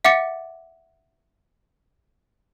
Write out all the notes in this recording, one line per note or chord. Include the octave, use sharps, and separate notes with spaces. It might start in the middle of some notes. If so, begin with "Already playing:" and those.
E5 F#5 D6 A6 C#7